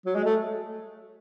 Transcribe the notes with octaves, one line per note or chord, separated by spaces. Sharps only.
F#3
G#3
A3